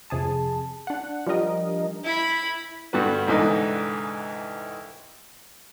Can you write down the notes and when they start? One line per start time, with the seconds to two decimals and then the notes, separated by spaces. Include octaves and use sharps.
0.10 F2 C3 G#4 A5
0.87 D4 F#5
1.27 F3 G3 D4 G4 A#4 D#5
2.03 E4 B5
2.93 G2 D3 G3 F#4 B4
3.27 C2 G#2 D3 E3 D#4